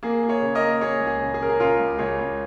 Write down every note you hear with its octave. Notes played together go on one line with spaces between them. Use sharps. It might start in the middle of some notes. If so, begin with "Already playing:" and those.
A#3 G#4
A#3
G#4 C#5
C#3
A#4 D#5
A#3
A#3 G#4 C#5
C#2
G#4
C#3
G#4
C#3 A#4
G#4
C#3 F4 A#4
C#2
C#2 G#4 C#5
C#2